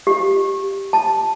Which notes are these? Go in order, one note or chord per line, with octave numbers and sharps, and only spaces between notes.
G4
A5